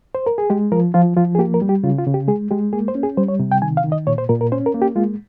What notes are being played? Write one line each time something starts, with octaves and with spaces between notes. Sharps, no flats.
C5
A#4
G#4
G#3 G4
F3 A#4
F3 F4
F3 F4
G#4
A#3 G4
A#4
G3
G4
C#3 F4
F4
C#3
G4
G#3 G#4
G#3 G4
A#3 G#4
C5
C#4
G#4
G3 C5
C#5
C3
G5
D#3 G#5
F5
D#3
D#5
A#2 C#5
C5
A#2 A#4
A#4
C#4 C5
A#4
A#3
G4
G#3 F4